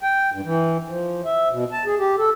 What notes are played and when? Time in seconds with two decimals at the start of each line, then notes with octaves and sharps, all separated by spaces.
0.03 G5
0.32 G2
0.44 E3
0.88 F3
1.25 E5
1.50 B2
1.72 A5
1.86 G#4
1.99 G4
2.18 A4